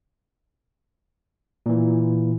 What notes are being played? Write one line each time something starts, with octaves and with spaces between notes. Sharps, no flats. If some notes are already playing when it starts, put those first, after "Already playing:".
A#2 E3